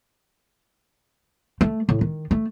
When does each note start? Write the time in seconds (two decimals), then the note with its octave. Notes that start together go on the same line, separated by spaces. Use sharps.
1.61 A3
1.89 A2
2.01 D#3
2.31 A3